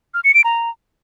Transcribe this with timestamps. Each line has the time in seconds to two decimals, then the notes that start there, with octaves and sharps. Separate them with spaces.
0.14 F6
0.24 C#7
0.34 D7
0.44 A#5